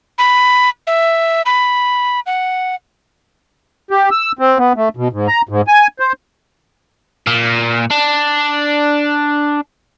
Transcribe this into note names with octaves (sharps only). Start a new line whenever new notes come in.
B5
E5
B5
F#5
G4
E6
C4
B3
A3
B2
G#2
A#5
G#2
G#5
C5
A#2
D4